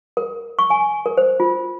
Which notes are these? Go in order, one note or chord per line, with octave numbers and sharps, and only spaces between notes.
A#4
C#6
G#5
A#4
C5
F4